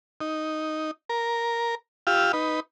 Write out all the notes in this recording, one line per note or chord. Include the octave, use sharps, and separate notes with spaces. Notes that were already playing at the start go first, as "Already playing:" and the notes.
D#4
A#4
F4 G4 F5 E6
D#4 B4